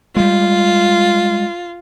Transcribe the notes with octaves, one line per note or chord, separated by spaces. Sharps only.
G3 G#3 F4